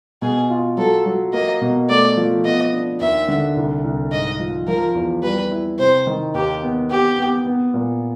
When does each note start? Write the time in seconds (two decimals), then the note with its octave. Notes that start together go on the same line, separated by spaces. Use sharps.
0.22 B2 G#4
0.50 F4
0.77 F#3 A4
1.06 F#3
1.33 A#3 D#5
1.61 B2
1.89 A3 D5
2.17 F3
2.45 B3 D#5
2.73 D4
3.00 D#2 E5
3.28 D3
3.56 C2
3.84 C2
4.12 G#2 D#5
4.40 F3
4.67 F3 A#4
4.95 E2
5.23 G3 B4
5.51 E4
5.79 C3 C5
6.07 D#3
6.34 D#2 G4
6.63 B3
6.90 B3 G4
7.18 B3
7.46 B3
7.74 A#2